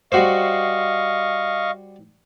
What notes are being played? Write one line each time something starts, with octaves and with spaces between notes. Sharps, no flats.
G3 F#4 C5 D#5 F5 C#6